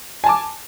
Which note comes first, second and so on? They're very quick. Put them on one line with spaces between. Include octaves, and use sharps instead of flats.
G#5 A5 D6